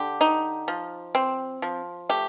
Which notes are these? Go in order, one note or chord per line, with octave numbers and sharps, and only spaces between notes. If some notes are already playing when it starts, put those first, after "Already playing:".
Already playing: D3 G4
D#4
F3
C4
F3
A3 G4